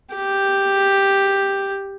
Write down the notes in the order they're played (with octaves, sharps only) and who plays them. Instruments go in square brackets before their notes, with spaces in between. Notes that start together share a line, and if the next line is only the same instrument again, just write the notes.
[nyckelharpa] G4